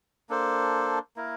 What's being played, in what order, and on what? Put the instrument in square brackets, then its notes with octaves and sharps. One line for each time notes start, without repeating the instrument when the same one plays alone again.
[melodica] A#3 D4 A4 C5
A#3 E4 A#4